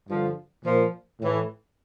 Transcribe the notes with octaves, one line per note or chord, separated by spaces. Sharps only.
G2 D3 F3
A#2 F3
A2 E3